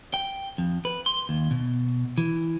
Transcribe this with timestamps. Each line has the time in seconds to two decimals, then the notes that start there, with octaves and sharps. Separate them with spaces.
0.14 G5
0.58 F2
0.85 B4
1.06 C6
1.29 D#2
1.51 B2
2.18 E3